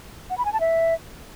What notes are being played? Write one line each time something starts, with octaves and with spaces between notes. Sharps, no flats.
F#5
B5
G#5
A5
E5